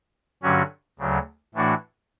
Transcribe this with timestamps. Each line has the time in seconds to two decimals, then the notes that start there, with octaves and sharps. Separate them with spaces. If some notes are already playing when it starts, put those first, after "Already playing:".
0.43 G2 D3 F#3 C#4 F#4
0.99 D2 C#3 F#3
1.54 A2 E3 A3 D4 F#4